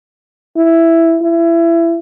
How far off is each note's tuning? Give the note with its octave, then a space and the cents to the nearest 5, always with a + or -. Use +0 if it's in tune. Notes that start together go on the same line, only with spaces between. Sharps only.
E4 +5
E4 +25